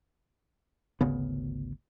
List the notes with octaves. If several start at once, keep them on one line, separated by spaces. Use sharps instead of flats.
G#1 D2 C#3 B3